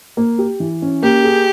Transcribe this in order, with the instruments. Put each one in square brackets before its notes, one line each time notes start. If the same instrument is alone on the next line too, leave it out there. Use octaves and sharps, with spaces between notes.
[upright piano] A#3
G4
E3
C#4
[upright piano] A#3 [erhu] G4
[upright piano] G#4